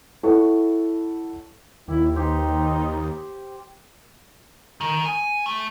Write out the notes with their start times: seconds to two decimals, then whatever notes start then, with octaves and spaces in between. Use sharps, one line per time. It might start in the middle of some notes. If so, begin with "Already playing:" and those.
0.23 E4 A4 C#5 F#5 C#6
1.88 D#2 E4 G4
2.16 D#4 G4 C5
4.81 D#3
5.05 G#5
5.46 A3